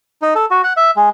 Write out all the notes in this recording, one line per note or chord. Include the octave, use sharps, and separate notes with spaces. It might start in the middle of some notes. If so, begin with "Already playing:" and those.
D#4
A4
F#4
F#5
E5
G#3